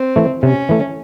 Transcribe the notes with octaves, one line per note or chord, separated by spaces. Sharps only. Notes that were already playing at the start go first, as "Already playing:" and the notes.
Already playing: C4
E3 A3
C3 C#4
E3 A3